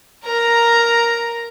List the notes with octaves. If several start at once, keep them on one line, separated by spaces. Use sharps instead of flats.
A#4 A#5